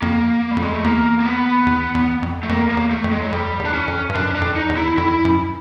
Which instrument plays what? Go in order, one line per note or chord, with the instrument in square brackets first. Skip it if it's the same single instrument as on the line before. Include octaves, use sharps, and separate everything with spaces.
[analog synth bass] F2 [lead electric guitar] A#3
[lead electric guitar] G3
[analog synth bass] F2
[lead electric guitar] G#3
A3
[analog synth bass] E2 [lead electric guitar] A#3
[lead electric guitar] A#3
B3
[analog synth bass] E2
E2
F2
[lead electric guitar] A3
[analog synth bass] F2 [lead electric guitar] A#3
[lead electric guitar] A#3
[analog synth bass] E2
[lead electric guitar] A3
[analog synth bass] F2
[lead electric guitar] G#3
F#3
[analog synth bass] F2 [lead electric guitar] G3
[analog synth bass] E2
[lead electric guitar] D4
C#4
[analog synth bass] F2
G2
[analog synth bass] F#2 [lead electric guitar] D4
[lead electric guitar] C#4
D4
[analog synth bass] F2
[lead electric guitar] D#4
[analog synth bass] E2
[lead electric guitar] E4
[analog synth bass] F2 [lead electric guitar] E4
[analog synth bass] F#2